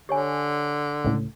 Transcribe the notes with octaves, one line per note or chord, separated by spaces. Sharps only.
D3 G4 C#5 G#5
C#2 A2